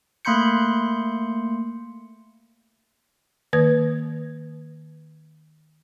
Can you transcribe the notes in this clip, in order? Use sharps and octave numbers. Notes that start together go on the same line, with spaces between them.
A3 A#3 B5 C6 G6 C#7
D#3 A#3 B4 G#6